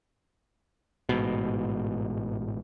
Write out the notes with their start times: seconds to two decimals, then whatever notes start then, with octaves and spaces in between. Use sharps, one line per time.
1.09 A1 G#2 B2